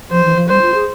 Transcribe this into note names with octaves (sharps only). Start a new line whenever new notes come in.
F3 C5
E3
F3
G3 C5
F4
G#4